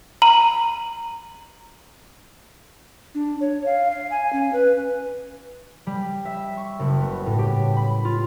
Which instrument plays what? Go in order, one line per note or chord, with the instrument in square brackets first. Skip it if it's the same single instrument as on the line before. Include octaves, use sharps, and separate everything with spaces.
[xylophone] A#5 B5 D#7 F#7
[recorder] D4
C#5
F5
F5
G#5
C#4
B4
[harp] G3
E5
C#6
F#1
B3
A2
G4
B5
F4